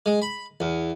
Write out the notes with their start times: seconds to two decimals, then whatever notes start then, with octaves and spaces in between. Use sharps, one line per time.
0.06 G#3
0.22 B5
0.60 E2